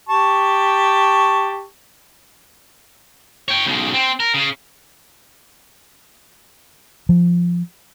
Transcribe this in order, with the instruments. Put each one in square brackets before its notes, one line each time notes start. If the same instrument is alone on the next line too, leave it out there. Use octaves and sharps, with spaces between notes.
[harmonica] G4 A5 C#6
[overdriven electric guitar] C#5 G5
B1 C#3
C4
A#4
C#3
[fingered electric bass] F3